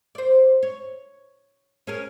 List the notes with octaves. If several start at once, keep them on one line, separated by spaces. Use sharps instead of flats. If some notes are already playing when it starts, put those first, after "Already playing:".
C5 D5
C#5
C#4 G#4 A#4